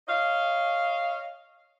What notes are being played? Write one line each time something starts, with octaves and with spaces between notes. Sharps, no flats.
C#5 D#5 F5